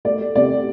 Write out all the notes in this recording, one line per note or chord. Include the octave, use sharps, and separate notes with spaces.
A3 D5
A3
C3 D5
C3